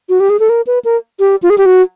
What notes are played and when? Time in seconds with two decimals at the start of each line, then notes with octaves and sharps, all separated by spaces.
0.09 F#4
0.20 G4
0.30 G#4
0.40 A4
0.49 A#4
0.67 B4
0.85 A#4
1.20 G4
1.43 F4
1.50 G#4
1.58 G4
1.66 F#4